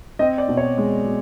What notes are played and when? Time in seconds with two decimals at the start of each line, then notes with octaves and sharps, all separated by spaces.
0.19 C4 D#5
0.38 D5
0.48 B2
0.57 C#5
0.78 G#3
1.06 B2